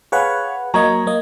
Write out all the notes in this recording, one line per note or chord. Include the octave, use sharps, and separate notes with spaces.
G#4 B4 C#5 F5 F#5 B5
F#3 A#3 D#5 A#5 C#6 G#6
A#3 D#5